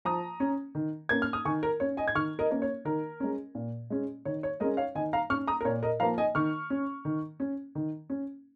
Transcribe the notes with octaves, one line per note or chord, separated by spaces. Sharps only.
F3 A#5 D#6
C#4
D#3
A#3 C#4 G#6
F6
D#6
D#3 G#5 C#6
A#4
C#4 C#5
D#5 G#5
G#6
D#3 C#6 F6
A#4 D#5
A#3 C#4
C#5
D#3 A#4
G#3 C#4
A#2
G#3 C#4
D#3 C#5
C#5
G#3 C#4 A#4 D#5
C#5 F5
D#3 D#5 G#5
F5 A#5
C#4 C#6 F6
A#5 D#6
A#4
A#2 C#5
A#4 D#5
F3 A#3 F5 A#5
D#5 G#5
D#3 C#6 F6
C#4
D#3
C#4
D#3
C#4